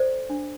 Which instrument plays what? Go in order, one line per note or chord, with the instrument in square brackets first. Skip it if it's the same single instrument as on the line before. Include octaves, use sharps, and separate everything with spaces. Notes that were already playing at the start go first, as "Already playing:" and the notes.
Already playing: [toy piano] A4 C5 D5
D4